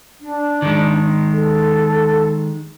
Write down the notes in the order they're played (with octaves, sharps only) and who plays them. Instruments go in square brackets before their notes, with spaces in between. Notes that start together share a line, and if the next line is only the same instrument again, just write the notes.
[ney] D4
[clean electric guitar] D#3 G#3
[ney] A4